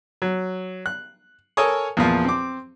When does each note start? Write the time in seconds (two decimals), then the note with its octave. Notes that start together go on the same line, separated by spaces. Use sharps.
0.22 F#3
0.86 F#6
1.57 A4 A#4 C#5 G#5 C#6 D#6
1.97 E2 A#2 F3
2.25 C4 D6